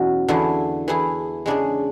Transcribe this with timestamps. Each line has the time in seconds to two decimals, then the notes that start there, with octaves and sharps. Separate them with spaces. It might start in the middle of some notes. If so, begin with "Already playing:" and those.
Already playing: E2 B2 F#3 C#4
0.28 E2 D3 A3 E4 G#4
0.88 E3 A3 E4 G#4
1.46 C#3 G#3 D4 G#4